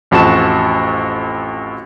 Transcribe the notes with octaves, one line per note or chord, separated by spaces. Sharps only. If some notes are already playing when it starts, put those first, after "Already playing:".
A1 F2 F#4 A5 E7